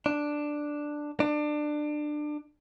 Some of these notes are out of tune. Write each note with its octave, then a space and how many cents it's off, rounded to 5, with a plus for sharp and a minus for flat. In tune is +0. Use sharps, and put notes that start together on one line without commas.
D4 +5
D4 +25